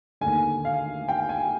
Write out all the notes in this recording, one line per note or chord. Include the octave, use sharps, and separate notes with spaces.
D#2 D3 G#5
F5
G5
G#5